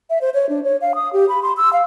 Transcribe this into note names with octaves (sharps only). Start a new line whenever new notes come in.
E5
C5
C#5
D4
C#5
F5
D#6
G4
B5
C6
E6
F5